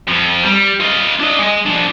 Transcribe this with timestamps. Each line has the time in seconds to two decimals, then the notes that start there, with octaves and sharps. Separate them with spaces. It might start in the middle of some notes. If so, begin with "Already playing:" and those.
0.08 F2 F3
0.43 G3
0.80 F4 D#5
1.20 D4 D#5
1.39 G#3 D#5
1.66 F3 D4